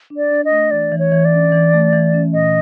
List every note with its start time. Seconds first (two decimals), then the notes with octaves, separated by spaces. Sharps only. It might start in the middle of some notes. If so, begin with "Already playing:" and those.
0.10 D4
0.17 D5
0.31 D4
0.45 D#5
0.51 A3
0.71 E3 D5
0.92 E3
0.99 C#5
1.12 E3
1.25 D5
1.32 C#4
1.52 E3
1.73 A3
1.93 E3
2.14 C#4
2.33 A#2 D#5